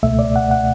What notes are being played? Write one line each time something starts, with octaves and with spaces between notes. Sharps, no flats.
C#2 B2 A3 E5
D5
F#5
F#5